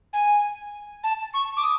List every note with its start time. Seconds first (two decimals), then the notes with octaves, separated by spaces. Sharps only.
0.13 G#5
1.03 A5
1.34 C#6
1.57 D6
1.63 D#6